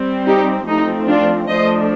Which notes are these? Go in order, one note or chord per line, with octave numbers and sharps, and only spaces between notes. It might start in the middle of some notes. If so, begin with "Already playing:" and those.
Already playing: G3 C4
D#4 G4
F3 A3 C4 D#4
D4 F4
F3 A3 D4 C5 D#5